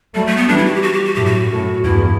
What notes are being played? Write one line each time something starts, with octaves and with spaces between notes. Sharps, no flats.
F#3 G3 A3
A3
B3
E3 G3 D4
E4
F#4
G4
F#4
G4
F#4
F#2 A2 G4
F#4
F#2 A2
E2 G2 E4